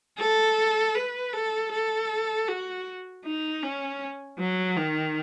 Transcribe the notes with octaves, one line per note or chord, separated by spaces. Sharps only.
A4
B4
A4
A4
F#4
D#4
C#4
F#3
D#3